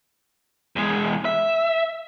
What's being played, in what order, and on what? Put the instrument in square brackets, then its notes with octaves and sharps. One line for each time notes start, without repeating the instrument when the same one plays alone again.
[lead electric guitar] E2 G#3
E5